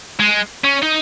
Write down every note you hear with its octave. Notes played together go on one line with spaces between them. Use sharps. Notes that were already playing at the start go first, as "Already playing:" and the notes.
G#3
C#4
D#4